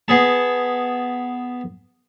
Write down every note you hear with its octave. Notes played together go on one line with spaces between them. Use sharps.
B3 G#4 A5